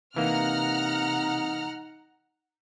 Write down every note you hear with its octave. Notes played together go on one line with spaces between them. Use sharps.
C3 E3 A#3 D#4 F#5 A#5 F6